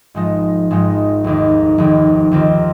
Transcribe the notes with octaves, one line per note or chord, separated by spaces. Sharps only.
G#1 G#2 F3 G#3 D#4
G#1 G#2 F3 G#3 D#4
F1 D#2 D#3
F1 D#2 D#3
D#2 D#3 C4 F4